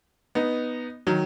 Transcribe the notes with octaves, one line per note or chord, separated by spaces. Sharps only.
B3 D#4
D#3 F#3